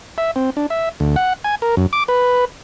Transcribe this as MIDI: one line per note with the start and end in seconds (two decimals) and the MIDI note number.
0.18 0.31 76
0.36 0.50 60
0.57 0.66 62
0.70 0.89 76
1.00 1.16 38
1.16 1.33 78
1.44 1.55 80
1.62 1.75 70
1.77 1.87 42
1.93 2.03 86
2.08 2.45 71